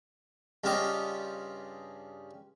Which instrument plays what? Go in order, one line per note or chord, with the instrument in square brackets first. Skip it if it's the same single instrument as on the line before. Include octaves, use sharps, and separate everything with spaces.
[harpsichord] G2 C#3 F4 G4 D#5